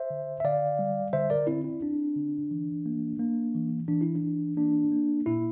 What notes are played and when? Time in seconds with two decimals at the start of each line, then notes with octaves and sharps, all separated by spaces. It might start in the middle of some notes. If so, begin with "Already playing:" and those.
Already playing: C5 E5
0.10 D3
0.40 E5
0.44 D3 D5 F5
0.79 G3
1.13 D3 C5 E5
1.30 A#4 D5
1.47 C4 E4
1.64 E4
1.82 C4 D4
2.16 D3
2.51 E3
2.86 A#3
3.19 A#3
3.55 E3
3.88 E3 D4
4.01 E4
4.15 D4
4.22 E3
4.57 A#3 D4
4.92 A#3
5.26 A#2 E4